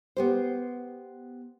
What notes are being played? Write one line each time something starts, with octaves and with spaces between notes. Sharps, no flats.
B3 G4 C5